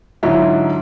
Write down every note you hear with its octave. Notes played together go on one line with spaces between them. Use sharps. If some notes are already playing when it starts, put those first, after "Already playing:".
G#2 D3 F#3 E4 F4